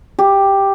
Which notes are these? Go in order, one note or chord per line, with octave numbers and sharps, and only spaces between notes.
G4